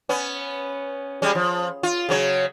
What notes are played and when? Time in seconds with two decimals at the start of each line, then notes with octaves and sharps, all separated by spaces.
0.09 B3 C#4
1.22 G3 G#3 C#4
1.35 F3
1.83 F4
2.09 C#3 F#3 C#5